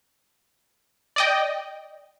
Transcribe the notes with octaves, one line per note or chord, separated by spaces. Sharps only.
D5 D#5 G5